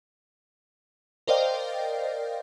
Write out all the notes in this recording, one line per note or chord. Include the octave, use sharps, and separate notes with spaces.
A#4 C5 D5 D#5 F5 G5